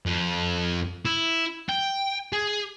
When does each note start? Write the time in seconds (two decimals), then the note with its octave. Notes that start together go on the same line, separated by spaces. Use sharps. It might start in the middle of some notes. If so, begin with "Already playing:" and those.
0.06 F2
1.05 E4
1.69 G5
2.33 G#4